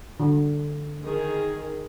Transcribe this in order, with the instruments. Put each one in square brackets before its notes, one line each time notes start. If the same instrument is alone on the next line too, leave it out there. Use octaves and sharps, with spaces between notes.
[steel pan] D3
[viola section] D#3 G#4